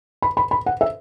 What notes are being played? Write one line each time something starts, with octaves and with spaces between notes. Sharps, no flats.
B5
B5
B5
F#5
E5